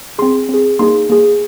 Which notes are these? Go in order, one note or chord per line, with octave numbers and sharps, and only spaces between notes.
C4 G#4 C6
C4
G#4
A#3 D#4 G#4 C6
A#3 G#4